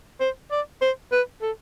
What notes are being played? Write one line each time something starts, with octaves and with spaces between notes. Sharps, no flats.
C5
D5
C5
B4
A4